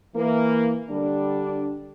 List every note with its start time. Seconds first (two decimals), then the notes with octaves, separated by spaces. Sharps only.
0.16 E3 A#3
0.90 D3 G3 D4